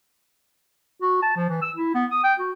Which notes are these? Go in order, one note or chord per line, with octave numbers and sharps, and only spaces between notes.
F#4
A5
F3
E3
E6
E4
B3
D#6
G5
F#4